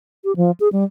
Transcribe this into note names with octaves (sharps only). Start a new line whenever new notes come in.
G4
F3
G#4
G3